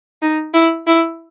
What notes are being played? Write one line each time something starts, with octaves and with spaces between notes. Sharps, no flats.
D#4
E4
E4